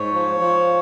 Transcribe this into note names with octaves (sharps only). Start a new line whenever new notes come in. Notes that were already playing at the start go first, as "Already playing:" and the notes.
Already playing: G#2 C#5
F3
F3